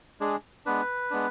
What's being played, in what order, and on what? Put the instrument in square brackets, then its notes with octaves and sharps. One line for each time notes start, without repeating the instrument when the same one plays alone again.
[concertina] G#3 D4 G#4
G#3 B3 D4 B4
G#3 B3 D4